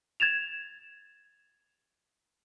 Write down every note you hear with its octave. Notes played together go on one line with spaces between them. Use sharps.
G#6 A6 E7 F7